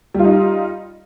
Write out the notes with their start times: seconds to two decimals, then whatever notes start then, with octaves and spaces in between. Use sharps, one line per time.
0.14 G3
0.19 F4
0.24 D#4